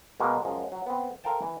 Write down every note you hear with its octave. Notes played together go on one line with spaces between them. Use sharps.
B2 G#3 A#3
F#2 F3 G#3
F#3
B3 C4
A4 A#4 C5 F5 G5 A5
E3